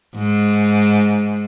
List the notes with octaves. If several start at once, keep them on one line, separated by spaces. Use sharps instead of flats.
G#2